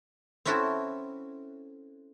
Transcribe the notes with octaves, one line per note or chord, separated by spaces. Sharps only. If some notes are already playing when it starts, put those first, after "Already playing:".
C4 C#4 E4 F#4 A4 C5